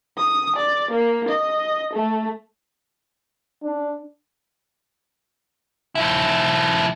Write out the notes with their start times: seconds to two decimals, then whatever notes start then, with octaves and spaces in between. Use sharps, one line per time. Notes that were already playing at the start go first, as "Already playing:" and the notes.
0.17 D#6
0.56 D5
0.91 A#3
1.29 D#5
1.94 A3
3.63 D4
5.95 F3 E4